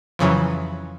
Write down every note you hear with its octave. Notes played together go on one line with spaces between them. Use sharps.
F2 C#3 E3 F#3